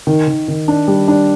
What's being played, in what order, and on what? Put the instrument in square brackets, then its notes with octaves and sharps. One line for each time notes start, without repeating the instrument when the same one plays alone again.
[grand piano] D#3
D#3
D#3
D4
G3
D4